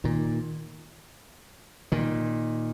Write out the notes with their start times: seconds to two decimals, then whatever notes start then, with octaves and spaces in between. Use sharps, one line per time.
0.04 A#2 D#3
1.92 A#2 D#3